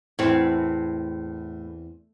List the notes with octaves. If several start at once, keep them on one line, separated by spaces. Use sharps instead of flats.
E2 A2 C4